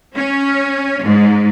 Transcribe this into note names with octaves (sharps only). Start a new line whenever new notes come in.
C#4
G#2